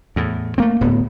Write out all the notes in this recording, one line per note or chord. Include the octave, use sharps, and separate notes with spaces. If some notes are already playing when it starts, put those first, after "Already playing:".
E2 A2
A3 A#3 C4
D1 A2 B3